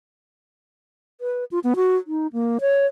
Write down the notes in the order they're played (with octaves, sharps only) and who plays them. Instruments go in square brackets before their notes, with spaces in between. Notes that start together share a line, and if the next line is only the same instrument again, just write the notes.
[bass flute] B4
F4
B3
F#4
D#4
A#3
C#5